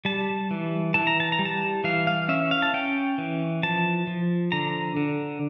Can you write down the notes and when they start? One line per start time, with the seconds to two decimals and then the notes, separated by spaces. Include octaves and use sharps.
0.05 G3 A5
0.51 E3
0.94 E3 A5
1.07 A#5
1.20 A5
1.32 A#5
1.39 G3
1.45 A5
1.84 E3 F5
2.07 F5
2.29 C#4 E5
2.51 F5
2.62 A5
2.74 C#4 G5
3.18 E3
3.63 F3 A5
4.07 F3
4.52 D3 A#5
4.97 D3